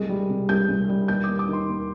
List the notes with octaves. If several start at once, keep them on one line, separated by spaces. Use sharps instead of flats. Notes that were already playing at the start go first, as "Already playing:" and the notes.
Already playing: C2 G#3
G3
C3
C2 G6
C2
G3
D#2 G6
A#3 D6
D6
D#3 C6
D#2